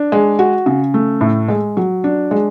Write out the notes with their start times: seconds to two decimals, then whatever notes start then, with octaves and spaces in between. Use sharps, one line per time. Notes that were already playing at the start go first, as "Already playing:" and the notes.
Already playing: D4
0.12 G#3
0.39 F#4
0.66 C#3
0.94 A3
1.21 A2
1.48 G#3
1.77 F#3
2.04 D4
2.31 G#3